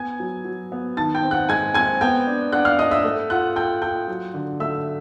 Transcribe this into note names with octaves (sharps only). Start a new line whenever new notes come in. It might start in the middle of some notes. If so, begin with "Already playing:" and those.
Already playing: B3 G#5 G#6
F#3
F#3
B3
D#3 A5 A6
G5 G6
C4
F#5 F#6
G#3 G#5 G#6
C4 G#5 G#6
B3 G5 G6
D4
D4 F#5 F#6
F5 F6
D4 D#5 D#6
E5 E6
A3
F4 F#5 F#6
F4 G5 G6
F4 G5 G6
F#3
D3
A3 E5 E6